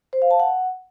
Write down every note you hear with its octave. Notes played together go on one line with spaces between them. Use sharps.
C5
F5
A5
F#5